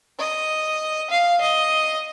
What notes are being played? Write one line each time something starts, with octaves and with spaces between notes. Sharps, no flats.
D#5
F5
D#5